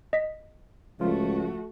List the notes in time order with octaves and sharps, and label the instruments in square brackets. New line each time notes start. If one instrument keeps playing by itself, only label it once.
[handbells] D#5 B6
[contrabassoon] C#2 [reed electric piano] F3 F4 [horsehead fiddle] A3 F#4